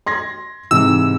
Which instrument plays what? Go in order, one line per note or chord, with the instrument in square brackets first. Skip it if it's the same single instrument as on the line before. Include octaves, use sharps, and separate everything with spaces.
[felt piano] C6 G#6 A#6
[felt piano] G#2 C3 E3 [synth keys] E6